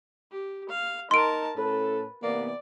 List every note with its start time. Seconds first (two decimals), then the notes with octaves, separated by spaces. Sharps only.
0.31 G4
0.69 F5
1.11 D#4 A#4 A5 C6 D7
1.57 A2 C#4 A4 B4
2.23 C3 E3 A#3 B3 D5